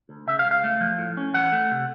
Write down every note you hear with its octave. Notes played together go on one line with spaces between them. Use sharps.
D2
C#3 E5
F5
C#2
F5
A3
F3
A2
C#4
E3 F#5
A3
C3